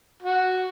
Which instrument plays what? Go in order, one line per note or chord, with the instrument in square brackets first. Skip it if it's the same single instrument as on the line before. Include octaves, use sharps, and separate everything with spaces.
[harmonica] F#4